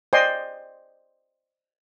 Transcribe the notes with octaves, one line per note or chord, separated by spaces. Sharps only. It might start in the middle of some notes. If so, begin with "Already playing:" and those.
C5 D5 D#5 G5 G#5 C6